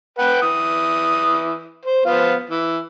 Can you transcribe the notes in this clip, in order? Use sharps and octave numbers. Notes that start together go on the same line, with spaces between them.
B4 F#5 G5
E3 D#6
C5
F3 B3 F4
E3